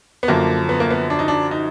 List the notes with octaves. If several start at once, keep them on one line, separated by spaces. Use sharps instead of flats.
B3
F#2 D3 F3 A#3
B3
A#3
B3
D4
D#4
D4
D#4